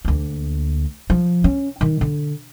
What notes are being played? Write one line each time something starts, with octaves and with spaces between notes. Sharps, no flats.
D2 A#3
F3
C#4
D#3
D3